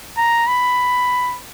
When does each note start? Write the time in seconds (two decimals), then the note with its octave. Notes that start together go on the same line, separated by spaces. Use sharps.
0.17 A#5
0.47 B5